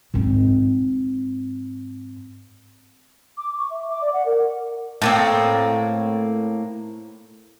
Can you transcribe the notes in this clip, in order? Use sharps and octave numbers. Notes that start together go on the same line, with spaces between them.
G#2 C4
D6
C#6
E5
D6
D5
F#5
A#4
A2 A#3 C4